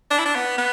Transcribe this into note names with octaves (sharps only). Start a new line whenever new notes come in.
D4
E4
D4
B3
B3